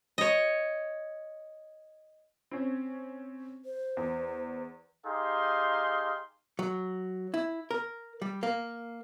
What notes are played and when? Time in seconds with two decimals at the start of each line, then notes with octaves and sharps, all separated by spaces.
0.18 C#5 D#5
2.51 C4 C#4
3.65 C5
3.97 E2
5.06 D#4 G4 G#4 F5 C6
6.59 F#3
7.34 E4
7.71 A#4
8.22 G3
8.43 A#3